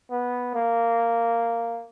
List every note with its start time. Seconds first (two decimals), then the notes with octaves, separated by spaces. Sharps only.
0.11 B3
0.54 A#3